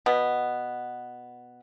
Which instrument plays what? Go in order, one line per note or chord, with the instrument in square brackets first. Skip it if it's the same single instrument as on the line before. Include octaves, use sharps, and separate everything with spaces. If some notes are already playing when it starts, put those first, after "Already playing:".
[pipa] B2 B3